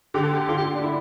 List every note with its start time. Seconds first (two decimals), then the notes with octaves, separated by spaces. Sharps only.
0.14 D3 G4
0.23 A4
0.33 G4
0.48 D3 F4
0.57 G4
0.75 D4
0.83 E4